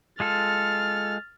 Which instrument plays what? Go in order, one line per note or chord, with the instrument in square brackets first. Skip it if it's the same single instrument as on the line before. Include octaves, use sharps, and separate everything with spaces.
[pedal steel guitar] G#3 F4 A4 [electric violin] F6 A6